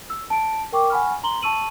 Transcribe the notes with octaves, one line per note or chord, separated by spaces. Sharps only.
E6
A5 D7
A#4 G5 C#6 D6
F#5 G#5 B5 C#6 F6
A#5 C6 F#7 G7
A5 C#6 E6 D#7 F#7